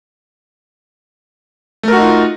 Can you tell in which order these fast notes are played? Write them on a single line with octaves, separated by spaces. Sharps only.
A3 A#4 F#4 D#4 F4